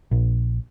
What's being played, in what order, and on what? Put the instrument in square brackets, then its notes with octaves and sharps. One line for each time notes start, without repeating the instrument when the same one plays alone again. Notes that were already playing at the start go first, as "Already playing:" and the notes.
[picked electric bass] A#1